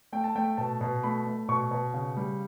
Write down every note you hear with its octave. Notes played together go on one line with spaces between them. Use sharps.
A3 G5
A5
A3 G5
B2 A5
B2
A3 B5
A3
B2 C#6
B2
C#3
G3